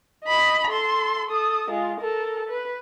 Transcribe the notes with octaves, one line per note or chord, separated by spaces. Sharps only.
D#5 B5
A4 C6
A4 D#6
G#3 F4
A4 A#4
B4